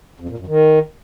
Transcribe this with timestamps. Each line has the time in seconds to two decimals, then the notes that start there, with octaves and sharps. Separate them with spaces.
0.20 F2
0.29 A#2
0.38 F#2
0.47 D#3